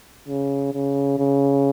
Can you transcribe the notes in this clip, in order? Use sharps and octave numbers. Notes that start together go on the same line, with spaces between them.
C#3
C#3
C#3